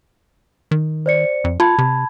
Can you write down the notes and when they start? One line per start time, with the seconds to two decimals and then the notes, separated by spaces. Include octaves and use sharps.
0.71 D#3
1.06 C5 D5 C#7
1.44 F2
1.60 F4 A5 B5 G#6
1.78 C3